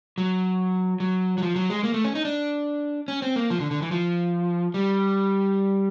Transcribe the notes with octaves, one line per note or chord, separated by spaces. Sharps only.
F#3
F#3
F#3
F3
F#3
G#3
A#3
A3
C#4
D#4
D4
C#4
C4
A#3
F3
D3
D3
E3
F3
G3